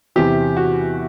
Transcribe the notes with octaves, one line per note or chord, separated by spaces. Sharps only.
E2 C3 E3 G4
F#4